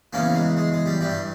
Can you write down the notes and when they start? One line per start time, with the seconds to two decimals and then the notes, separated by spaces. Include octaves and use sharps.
0.13 E2 C#3 E3 A#3 C#4
0.35 G#3
0.57 G#3
0.72 G#3
0.86 G3
1.01 G2 E3 G3